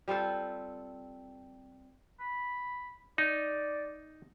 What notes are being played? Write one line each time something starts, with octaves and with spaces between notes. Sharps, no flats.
G3 C4 F4 A4
B5
D#4 D5